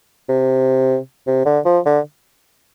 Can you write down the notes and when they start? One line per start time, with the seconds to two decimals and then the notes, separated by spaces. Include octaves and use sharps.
0.29 C3
1.27 C3
1.45 D3
1.65 F3
1.86 D3